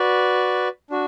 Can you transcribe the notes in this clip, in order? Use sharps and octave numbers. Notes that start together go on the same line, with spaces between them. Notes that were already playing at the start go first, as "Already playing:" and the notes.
Already playing: F#4 B4 D5
D4 F#4